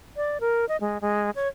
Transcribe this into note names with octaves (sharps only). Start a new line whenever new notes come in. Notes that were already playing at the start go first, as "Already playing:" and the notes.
D5
A#4
D#5
G#3
G#3
C#5